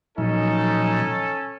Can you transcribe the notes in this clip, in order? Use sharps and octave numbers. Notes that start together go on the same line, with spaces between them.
A#2 F3 F#3 C#4 D#4 A4